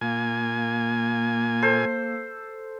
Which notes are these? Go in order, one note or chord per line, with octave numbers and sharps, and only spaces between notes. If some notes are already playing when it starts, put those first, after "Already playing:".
A#2 A#3 G#5
A4 C5